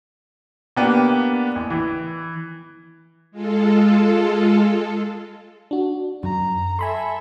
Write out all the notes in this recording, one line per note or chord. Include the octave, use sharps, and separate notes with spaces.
A#3 B3 D4 G4
A1
E3
G#3 F4 A4
D4 F#4
F#2 A#5
A4 E5 G#5 B5 C6